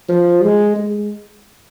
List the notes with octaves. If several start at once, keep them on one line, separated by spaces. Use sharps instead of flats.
F3
G#3
G#3